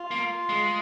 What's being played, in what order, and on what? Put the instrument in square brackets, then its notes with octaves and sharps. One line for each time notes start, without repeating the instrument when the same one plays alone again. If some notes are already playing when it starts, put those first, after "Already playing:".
Already playing: [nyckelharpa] F4
[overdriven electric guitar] A#3
G#3